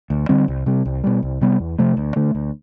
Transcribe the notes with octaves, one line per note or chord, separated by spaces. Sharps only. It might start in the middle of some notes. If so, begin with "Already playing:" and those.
D2
D3 G3 C4
C2
C3 G3
C2
B2 G3
C2
C3 G3 B3
E2
C3 F3 A3
D2
D3 A3
D2